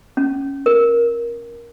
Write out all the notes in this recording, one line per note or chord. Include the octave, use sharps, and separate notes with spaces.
C#4
A#4